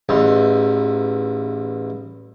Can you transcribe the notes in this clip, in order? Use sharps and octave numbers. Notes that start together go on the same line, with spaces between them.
A1 E2 D#4